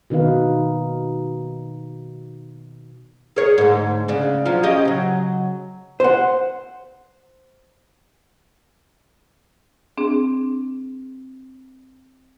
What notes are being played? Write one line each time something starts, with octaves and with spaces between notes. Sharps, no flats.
B2 D#3 D#4 B4 F5
G#4 A#4 C#5
D2 G#2
C#3 D4
F3 F#3 F4
C#4 G4 D#5
C#3 F#3
C5 F#5
C4 D4 G#4